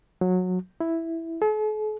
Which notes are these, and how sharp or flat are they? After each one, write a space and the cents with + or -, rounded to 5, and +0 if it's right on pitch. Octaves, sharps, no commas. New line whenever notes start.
F#3 -20
E4 +0
A4 -45